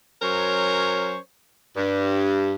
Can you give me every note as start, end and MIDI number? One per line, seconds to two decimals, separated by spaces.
0.22 1.17 54
0.22 1.17 61
0.22 1.17 70
0.22 1.17 72
0.22 1.17 73
1.76 2.55 43